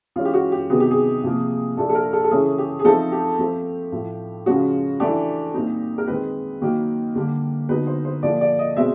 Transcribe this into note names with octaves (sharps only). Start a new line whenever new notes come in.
E3 G#3 C#4 F4
G4
F#4
G4
C3 D#3 F#3 B3 G#4
G4
G#4
C3 F3 A#3
A#2 F3 A3 D4 A4
A4
A#4
A4
A4
C#3 E3 A3 C#4 G#4
G4
G#4
F3 A3 C4 D#4 A4
G4
F3 A3 C4
A2 F3 A3
C#3 F3 G#3 C#4 F#4
E3 A3 D4 G4
A#2 G3 C4 D#4
A#4
D#3 G#3 C4 D#4 B4
D#3 F#3 A#3
D3 G3 A#3
D3 F#3 B3 D#4 B4
C5
C5
A#2 F3 A3 D5
D5
D#5
B2 G#3 C4 E5